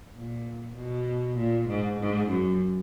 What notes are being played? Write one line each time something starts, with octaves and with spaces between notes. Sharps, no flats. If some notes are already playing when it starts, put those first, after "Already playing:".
A#2
B2
A#2
G#2
G#2
F#2